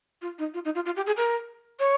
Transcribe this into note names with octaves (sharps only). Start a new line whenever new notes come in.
F4
D#4
F4
D#4
F4
F4
G4
G#4
A#4
C#5